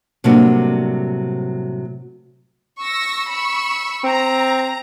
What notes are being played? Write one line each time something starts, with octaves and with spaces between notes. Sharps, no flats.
A2 C3 F#3 G3 A#3 D4
C#6 E6 A#6
B5 C#6 E6
C4 A#5